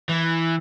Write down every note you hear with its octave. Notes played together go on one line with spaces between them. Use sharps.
E3